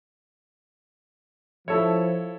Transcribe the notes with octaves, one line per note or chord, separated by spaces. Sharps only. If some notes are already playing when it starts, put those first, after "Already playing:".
F3 E4 A4 C#5